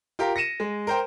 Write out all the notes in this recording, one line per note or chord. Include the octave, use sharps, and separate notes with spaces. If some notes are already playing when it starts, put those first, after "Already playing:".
F4 G4 A#4
A#6 C#7 D#7 E7
G#3
A#4 C5 G5